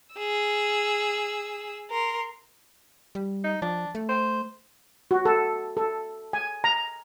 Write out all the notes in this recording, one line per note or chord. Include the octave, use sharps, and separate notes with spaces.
G#4 E6
A#4 C6
G3
D#4
F3 D4
A3
C5
F#4
A4
A4
G#5
A#5